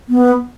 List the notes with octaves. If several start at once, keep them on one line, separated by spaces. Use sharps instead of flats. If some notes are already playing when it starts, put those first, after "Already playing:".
B3